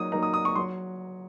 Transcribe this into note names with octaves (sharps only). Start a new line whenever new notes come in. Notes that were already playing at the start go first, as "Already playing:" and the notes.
Already playing: F#3 A#3 D#4 D#6
F#3 A#3 D#4 A#5
D#6
D#6
C#6
F#3 C6